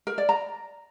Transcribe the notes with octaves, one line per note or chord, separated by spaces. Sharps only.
A#4
D5
A#5